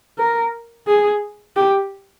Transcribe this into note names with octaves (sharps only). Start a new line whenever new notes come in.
A#4
G#4
G4